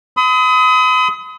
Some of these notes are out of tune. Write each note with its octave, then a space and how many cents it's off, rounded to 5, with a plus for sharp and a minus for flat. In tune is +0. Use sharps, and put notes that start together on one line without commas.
B5 +45 D#6 +30